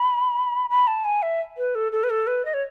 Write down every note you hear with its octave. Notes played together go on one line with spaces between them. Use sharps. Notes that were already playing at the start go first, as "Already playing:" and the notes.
Already playing: B5
B5
A5
G#5
E5
B4
A4
A4
B4
A4
B4
D#5
C#5